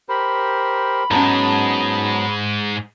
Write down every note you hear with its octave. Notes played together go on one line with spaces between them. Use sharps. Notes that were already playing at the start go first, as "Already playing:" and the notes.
G4 A#4 C5 B5
G#2 F#3 G#3 B3 C#4 A5 A#5